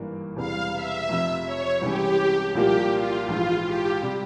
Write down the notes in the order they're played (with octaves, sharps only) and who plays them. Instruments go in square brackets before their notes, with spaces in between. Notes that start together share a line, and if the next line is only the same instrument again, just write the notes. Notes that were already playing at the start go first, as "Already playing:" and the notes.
Already playing: [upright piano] G#1 G2 E3 A#3
[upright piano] E1 E2 C3 E3 G3 [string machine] F5
[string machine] E5
[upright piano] F1 F2 C3
[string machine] C#5
[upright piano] C2 C3 E3 G#3 C#4 [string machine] G4
[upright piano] C2 A#2 F3 A#3 [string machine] G4
[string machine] F4
[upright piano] A#1 G#2 E3 [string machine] F4
[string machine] G4
[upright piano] C3 G3